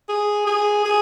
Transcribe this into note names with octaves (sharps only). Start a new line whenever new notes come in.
G#4
G#4
G#4